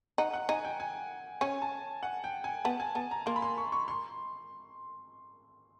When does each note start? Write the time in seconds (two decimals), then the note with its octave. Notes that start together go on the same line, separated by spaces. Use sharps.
0.18 D#4 F#5
0.33 F#5
0.49 D#4 G#5
0.65 G5
0.80 G#5
1.41 C#4 G#5
1.62 A5
2.03 F#5
2.24 G5
2.44 G#5
2.65 B3 A5
2.80 G#5
2.95 B3 A5
3.11 A#5
3.26 A#3 C6
3.36 B5
3.42 C6
3.58 C#6
3.72 C#6
3.88 C6